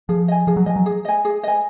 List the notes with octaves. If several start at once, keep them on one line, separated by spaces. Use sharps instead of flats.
F3 G#4
D#5 G#5
F3 G#4
F#3
F3 D#5 G#5
F#3
G#4
D#5 G#5
G#4
D#5 G#5